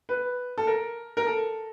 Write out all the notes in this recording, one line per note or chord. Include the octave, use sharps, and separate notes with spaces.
B4
A4
A#4
A#4
A4